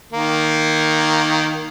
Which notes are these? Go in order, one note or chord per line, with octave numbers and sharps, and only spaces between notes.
D#3 A#3